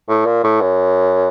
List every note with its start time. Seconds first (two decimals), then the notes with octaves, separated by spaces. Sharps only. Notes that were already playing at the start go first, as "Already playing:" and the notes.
0.09 A2
0.26 A#2
0.44 A2
0.61 F#2